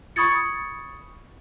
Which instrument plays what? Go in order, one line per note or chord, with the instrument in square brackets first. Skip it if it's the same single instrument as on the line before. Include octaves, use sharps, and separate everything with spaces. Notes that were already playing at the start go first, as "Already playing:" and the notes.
[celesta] B5 C#6 D#6 G#6 A6 C#7